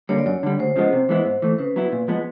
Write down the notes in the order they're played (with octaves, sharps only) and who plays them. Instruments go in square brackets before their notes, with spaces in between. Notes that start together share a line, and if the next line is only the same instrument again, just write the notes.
[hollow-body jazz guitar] D3 G3 A#3 [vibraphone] C#5
[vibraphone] D5
[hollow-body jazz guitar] F#2 [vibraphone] C#5
[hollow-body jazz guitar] D3 G3
[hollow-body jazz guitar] D2 [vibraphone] C5
[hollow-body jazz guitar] C#3 F3 G#3 B3
C3
E3 G#3 B3 E4
G#2
E3 A3
[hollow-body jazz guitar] C#3 [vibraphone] B4
[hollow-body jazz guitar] F#3 B3 E4
A#2
F3 G#3 B3